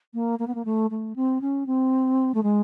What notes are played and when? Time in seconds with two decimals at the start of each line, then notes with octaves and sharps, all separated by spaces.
0.14 A#3
0.39 A#3
0.47 B3
0.55 A#3
0.65 A3
0.90 A3
1.16 C4
1.41 C#4
1.66 C4
2.34 A3
2.43 G#3